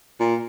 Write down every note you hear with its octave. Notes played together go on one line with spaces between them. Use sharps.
A#2